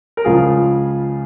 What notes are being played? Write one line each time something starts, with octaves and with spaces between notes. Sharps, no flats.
A#4
C#2 C#3 F3 F4 G#4